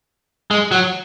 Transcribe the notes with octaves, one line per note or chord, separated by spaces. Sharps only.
G#3
F#3